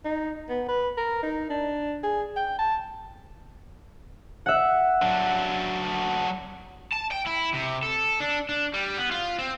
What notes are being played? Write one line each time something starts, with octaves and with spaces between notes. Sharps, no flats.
D#4
B3
B4
A#4
D#4
D4
G#4
G5
A5
E5 F#5
F#3 D4
A5
G5
E4
C3
A4
D4
D4
G3
B3
F4
C4